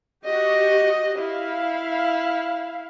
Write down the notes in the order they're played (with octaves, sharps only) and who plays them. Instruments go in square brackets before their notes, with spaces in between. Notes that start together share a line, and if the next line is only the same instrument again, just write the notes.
[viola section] F#4 G4 [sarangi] D#5
[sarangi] E4 [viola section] F5